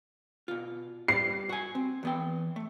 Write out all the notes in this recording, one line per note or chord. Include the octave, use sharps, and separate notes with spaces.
B2 F4
G3 C7
F#4 G#5
C4
E2 B3 G5
A3